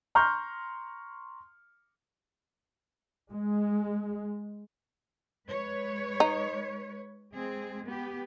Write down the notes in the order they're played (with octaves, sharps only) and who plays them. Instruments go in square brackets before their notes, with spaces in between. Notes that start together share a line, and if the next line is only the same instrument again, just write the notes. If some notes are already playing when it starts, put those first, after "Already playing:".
[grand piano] A#5 C6 C#6 F6 G6
[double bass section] G#3
[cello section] G#3 B4 C#5
[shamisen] D#4
[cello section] G#3 C4 G#4
B3 G4